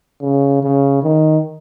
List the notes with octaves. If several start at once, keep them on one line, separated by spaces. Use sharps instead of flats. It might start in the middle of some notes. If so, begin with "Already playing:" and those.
C#3
C#3
D#3